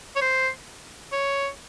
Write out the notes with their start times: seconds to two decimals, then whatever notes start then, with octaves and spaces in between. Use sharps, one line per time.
0.16 C#5
0.21 C5
1.12 C#5